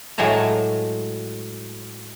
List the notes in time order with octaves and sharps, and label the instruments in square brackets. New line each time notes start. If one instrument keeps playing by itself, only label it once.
[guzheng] A2 F#3 G#3 A5 A#5